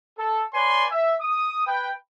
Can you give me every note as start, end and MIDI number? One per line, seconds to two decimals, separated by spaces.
0.19 0.44 69
0.54 0.85 71
0.54 0.85 73
0.54 0.85 74
0.54 0.85 80
0.54 0.85 84
0.91 1.14 76
1.21 1.62 87
1.66 1.91 71
1.66 1.91 79